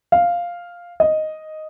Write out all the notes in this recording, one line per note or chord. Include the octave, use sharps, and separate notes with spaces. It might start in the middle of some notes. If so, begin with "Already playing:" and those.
F5
D#5